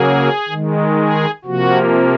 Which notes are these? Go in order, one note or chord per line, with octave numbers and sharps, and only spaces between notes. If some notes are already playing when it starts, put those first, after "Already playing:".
Already playing: C#3 F#3 A#3 G#4
D#3 G#3
G#4
C3 F3 A#3 F#4